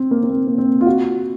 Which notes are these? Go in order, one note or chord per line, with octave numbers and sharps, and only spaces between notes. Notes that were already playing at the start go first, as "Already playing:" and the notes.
Already playing: C4
A#3
C4
A#3
A#3
C4
F4
F#4